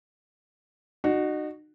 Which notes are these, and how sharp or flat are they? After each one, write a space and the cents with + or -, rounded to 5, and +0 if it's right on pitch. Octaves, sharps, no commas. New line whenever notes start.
D#4 -35 F#4 +0